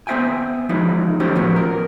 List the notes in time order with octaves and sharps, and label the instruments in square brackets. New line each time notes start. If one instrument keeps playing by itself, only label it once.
[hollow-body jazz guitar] B3 C4 C5 E5 G5 G#5
F3 F#3 G#3 D#4 E4
D3 A3 C#4 G4 C5 C#5
A2 F3 F#3 B3
A#4